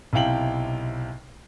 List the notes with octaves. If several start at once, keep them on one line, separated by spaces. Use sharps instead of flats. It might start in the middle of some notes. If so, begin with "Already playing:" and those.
B1 C3 E4 F5 G5 F#7